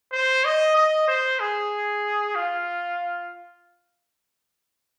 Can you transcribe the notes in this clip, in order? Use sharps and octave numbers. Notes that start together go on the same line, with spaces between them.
C5
D#5
D#5
C5
G#4
F4